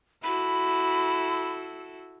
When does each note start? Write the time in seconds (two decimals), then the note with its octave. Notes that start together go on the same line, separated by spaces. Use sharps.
0.24 E4 F#4 A4 B5